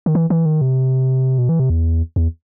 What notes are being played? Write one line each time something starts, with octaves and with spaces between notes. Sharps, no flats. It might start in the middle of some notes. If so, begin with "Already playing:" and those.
D#3
E3
E3
D#3
C3
B2
E3
C3
E2
E2